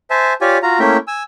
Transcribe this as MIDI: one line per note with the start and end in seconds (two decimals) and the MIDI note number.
0.10 0.33 72
0.10 0.33 76
0.10 0.33 80
0.10 0.33 81
0.41 0.58 65
0.41 0.58 67
0.41 0.58 73
0.41 0.58 74
0.41 0.58 80
0.63 0.79 65
0.63 0.79 66
0.63 0.79 82
0.80 0.97 57
0.80 0.97 58
0.80 0.97 61
0.80 0.97 64
0.80 0.97 76
0.80 0.97 79
1.08 1.23 80
1.08 1.23 88